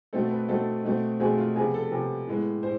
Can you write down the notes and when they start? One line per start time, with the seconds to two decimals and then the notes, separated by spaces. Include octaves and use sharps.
0.13 B2 A3 C4 A4
0.31 B4
0.49 B2 A3 C4 A4
0.85 B2 A3 C4
1.20 B2 A3 C4 G#4
1.38 F4
1.56 C3 F3 B3 G#4
1.74 A4
1.91 C3 F3 B3
2.27 A2 G#3 B3
2.63 A2 C5